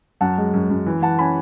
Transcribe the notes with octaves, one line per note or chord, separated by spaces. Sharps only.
F#2 F#5 A5
G#3
F#2
F#2
E3
E3 F#5 A5
C#4 G#5 B5